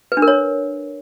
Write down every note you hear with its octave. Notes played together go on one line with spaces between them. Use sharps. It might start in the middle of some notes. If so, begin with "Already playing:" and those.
B4
D4
A#4
C#5